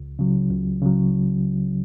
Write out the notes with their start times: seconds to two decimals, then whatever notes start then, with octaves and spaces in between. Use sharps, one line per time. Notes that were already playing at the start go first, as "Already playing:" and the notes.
Already playing: C#2
0.19 C#3 F#3
0.50 C#2
0.82 C#3 F#3